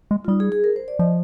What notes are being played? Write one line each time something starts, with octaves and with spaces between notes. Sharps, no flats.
G#3
F4
G3 D#4
G#4
G#4
A#4
C5
D5
F3 D#5